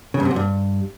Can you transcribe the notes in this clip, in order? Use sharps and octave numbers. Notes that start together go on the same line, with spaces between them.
C#3
G2
C3
F#2
G2